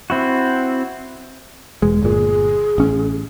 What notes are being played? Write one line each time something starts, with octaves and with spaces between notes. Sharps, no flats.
C4 E4 F#4
E1 G#3
G1 A#2 G#4
A1 C#4